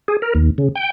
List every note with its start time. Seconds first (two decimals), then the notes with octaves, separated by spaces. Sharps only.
0.08 G#4
0.22 A#4
0.35 D#2
0.58 C#3
0.75 G5